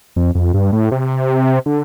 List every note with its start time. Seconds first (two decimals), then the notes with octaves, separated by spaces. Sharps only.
0.16 F2
0.35 F2
0.54 G2
0.72 A2
0.92 C3
1.66 D3